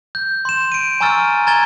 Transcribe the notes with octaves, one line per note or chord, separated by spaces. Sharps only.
G6
C6 E7
D7 D#7
G#5 A#5 C#6 E6 F6 A6
A#5 G#6 A6 G7